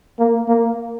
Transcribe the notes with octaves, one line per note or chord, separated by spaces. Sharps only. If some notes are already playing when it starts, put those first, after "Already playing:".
A#3
A#3